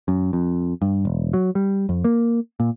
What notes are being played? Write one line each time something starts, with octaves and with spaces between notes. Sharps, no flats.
F#2
F2
G2
E1
F#3
G3
F2
A#3
A#2